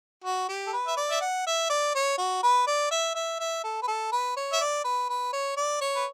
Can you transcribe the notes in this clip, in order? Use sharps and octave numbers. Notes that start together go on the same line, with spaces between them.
F#4
G4
A4
B4
E5
D5
E5
F#5
E5
D5
C#5
F#4
B4
D5
E5
E5
E5
A4
B4
A4
B4
C#5
E5
D5
B4
B4
C#5
D5
C#5
B4